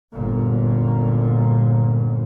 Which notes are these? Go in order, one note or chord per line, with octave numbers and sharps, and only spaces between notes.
G1 F#2 A#2